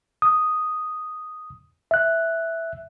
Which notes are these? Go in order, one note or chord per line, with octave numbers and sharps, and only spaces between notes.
D#6
E5 F#6